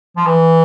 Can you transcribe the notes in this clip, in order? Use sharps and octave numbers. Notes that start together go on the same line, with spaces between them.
F3
E3